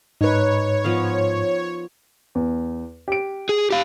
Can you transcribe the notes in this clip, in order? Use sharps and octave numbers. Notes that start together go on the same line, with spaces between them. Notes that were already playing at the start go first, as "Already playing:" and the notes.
G#2 D#4 B4 C#5
F3 B3 F5
E2
G4 D7
G#4
G4 F5